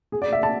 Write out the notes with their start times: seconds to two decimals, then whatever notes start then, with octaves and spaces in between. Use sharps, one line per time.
0.12 G#4
0.22 D5
0.33 E5
0.43 A5